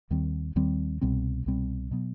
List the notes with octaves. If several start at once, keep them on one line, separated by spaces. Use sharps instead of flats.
D#2 D#3 G3 C4
D#2 D#3 G3 C4
C2 B2 G3 C4
C2 B2 G3 C4
B2 F#3 B3